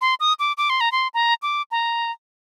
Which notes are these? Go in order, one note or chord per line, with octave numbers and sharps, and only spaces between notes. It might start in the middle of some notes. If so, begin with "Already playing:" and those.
C6
D#6
D6
D6
C6
A#5
C6
A#5
D6
A#5